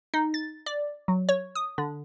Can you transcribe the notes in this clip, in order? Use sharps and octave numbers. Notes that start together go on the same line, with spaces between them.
D#4
A6
D5
F#3
C#5
D#6
D3